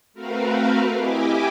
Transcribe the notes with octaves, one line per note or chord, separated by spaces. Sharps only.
A3 C4 F#4 A#4 B4 F5
E4 G4 D#5 E5 G#5 D6